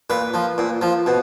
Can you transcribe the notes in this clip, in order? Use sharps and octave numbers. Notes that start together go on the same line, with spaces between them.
A#2 B4
F3
A#2
F3
B2